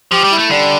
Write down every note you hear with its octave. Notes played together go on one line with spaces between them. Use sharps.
F3 G4
G3
E4
A3
D3 G3